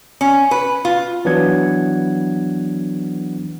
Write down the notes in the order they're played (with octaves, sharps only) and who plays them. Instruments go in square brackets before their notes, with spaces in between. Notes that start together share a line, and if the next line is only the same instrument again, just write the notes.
[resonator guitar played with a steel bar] C#4
B4
F4
[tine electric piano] E3 F#3 B3 D4 F#5 G#6